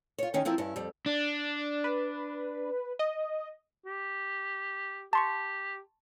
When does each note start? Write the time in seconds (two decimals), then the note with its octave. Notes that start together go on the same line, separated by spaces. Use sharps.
0.18 F4 C#5
0.34 D#3 C#4 G4
0.45 F3 C4 E4 F4 A#4
0.58 G2 C#4 E4
0.76 F2 G3
1.06 D4
1.84 B4
2.99 D#5
3.86 G4
5.13 G4 A5 C6 C#6